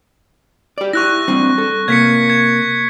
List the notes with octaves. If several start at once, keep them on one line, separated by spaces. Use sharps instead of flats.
G4 D5
E4 G4 C#6 F#6 A#6
G3 C4 D4
A4
C3 A#3 G#6 B6 C#7
G#6